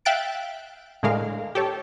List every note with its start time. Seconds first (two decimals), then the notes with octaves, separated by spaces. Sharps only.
0.05 E5 F5 G5 F#6 A6 D7
1.03 A2 D3 G#3 A#4 F5
1.55 G4 A4 C#5